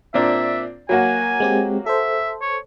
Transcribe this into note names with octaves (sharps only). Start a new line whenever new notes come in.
A#2 C4 D4 E5
F#3 A#3 F#4 G#5
G#3 C4 G4
A4 C5 E5
C#5